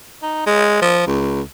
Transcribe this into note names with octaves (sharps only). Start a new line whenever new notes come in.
D#4
G#3
F3
C#2